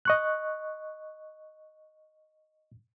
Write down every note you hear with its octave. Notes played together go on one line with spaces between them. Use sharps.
D#5 C#6 F#6